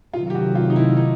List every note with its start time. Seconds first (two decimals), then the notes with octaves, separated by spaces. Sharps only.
0.14 C3 D#3 F#3 A3 F4
0.30 G4
0.35 F#4
0.55 F4
0.70 D#4
0.76 E4
0.97 D#4